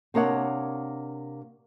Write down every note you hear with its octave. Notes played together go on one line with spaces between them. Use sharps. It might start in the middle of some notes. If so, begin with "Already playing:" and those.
C3 A#3 D4 C#5 D#5 F#5